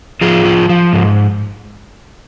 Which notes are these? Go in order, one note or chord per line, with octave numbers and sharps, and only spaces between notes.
F3 F4 G#4
F3
F3
G#2